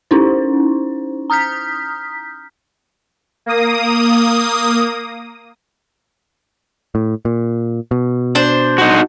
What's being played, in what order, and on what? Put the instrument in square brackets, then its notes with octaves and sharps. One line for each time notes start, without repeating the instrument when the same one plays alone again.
[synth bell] C#4 D#4 E4 C5
A#5 D#6 F6 G6 B6
[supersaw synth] A#3 D#6
[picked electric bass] A2
A#2
B2
[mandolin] D4 C5
[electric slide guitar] D#4 F#4